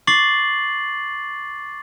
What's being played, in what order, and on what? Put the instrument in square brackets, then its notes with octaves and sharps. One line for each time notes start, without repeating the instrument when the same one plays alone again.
[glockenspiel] C#6 D6 A6 C7 F#7